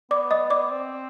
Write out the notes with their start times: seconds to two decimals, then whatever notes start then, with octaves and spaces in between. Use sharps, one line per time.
0.11 B3 D5 D6
0.31 D#5 D#6
0.50 D5 D6
0.71 C4